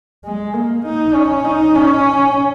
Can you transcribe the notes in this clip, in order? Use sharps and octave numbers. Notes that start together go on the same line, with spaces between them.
G#3
A#3
D#4
C#4
D#4
C#4